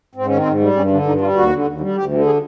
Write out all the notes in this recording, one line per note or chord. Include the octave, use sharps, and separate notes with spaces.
G#2 C4
D#3 C#4
C4
G#2
G3
G2 C#4
D3 D4
G2 D#4
G3 F4
D#2 F#4
D3
D#2
G3
D2 G4
D3
G#4